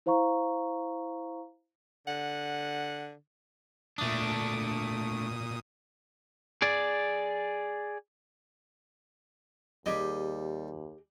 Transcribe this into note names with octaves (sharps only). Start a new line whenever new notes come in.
E4 C5 F5 A#5 C#6
D3 F#5
A#2 A3 D4 D#6
G#4 D5
D#2 G3 G4 G#4 D#5